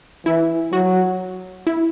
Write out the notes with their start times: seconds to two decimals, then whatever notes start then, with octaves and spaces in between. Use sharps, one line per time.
0.26 E3 E4
0.73 F#3 F#4
1.67 E4